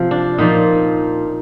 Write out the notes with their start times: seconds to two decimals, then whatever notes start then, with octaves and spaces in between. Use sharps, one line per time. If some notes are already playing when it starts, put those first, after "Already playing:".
Already playing: C3 F3 F4
0.11 D4
0.38 A#2 F3 D#4